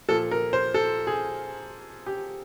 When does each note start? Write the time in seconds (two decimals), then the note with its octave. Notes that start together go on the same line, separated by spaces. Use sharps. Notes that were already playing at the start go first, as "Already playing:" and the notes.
0.09 A#2 F3 A4
0.31 A#4
0.53 C5
0.74 A4
1.07 G#4
2.06 G4